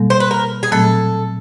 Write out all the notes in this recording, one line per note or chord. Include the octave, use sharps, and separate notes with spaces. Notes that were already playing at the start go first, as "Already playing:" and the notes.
Already playing: B2 G3 A#3
C5
B4
A#4
G#4
A#2 F#3 A3 C4 A4